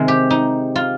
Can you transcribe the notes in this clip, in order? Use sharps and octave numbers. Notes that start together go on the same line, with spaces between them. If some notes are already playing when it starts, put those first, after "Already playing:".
Already playing: C3 D#3 G#3 C4
G4
D#4
F4